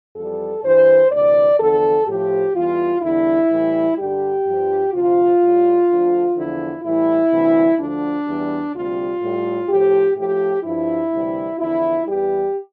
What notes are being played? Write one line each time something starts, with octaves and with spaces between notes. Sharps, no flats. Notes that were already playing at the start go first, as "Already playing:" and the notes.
F2 E3 G3 A4
G2 E3 G3 C5
D2 C3 E3 D5
E2 D3 F3 A4
A2 F3 G4
E2 E3 G3 F4
E2 D3 G3 E4
A2 E3 G3
G2 D3 G3 G4
G2 F3
D2 C3 F3 F4
A2 G3
D2 D3 F3
E2 D3 F3 E4
A2 E3 G3 E4
D2 C3 E3 G3
D2 D3 F3 D4
E2 E3 G3
D2 C3 G3 F4
A2 G3
A2 F3 G4
A2 F3 G4
G2 F3 E4
D2 C3 E3 G3
E2 D3 F3 E4
E2 E3 G3 G4